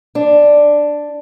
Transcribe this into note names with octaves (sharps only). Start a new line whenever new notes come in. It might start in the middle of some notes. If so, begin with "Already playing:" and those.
D4